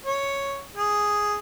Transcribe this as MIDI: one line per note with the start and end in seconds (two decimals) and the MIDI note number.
0.06 0.61 73
0.75 1.36 68